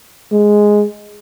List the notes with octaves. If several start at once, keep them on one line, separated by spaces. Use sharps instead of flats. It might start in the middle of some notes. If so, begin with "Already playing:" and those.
G#3